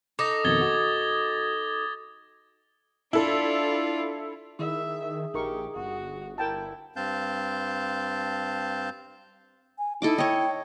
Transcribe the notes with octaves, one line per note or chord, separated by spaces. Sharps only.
D#4 A4 D6 D#6 A#6
F2 B2 D#3 G#6 A6 G7
F#4
D4 E4 F4 A4
D#3 E4 G#4 E5
A#1 D#4 G4 A#4 C#6
G1 F#4
E4 A#4 G5 A5
G2 C4 F5 A5 G6
G#5
D#4 E4 A4 D#5 D6
C#5 D#5 G5